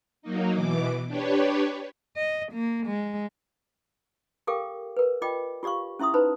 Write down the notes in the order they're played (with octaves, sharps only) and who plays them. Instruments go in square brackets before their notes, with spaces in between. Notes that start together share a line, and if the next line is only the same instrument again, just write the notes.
[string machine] F#3 A#3 D#4
B2 E3 D6
D4 G4 B4 C#5
[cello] D#5
A#3
G#3
[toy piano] G4 A4 A#4 F5 G5 D6
A#4 B4
F4 D5 D#5 G5 D6
F4 G4 D5 F5 C#6
C#4 E4 E5 C6 D#6
D#4 B4 C5 A5 B5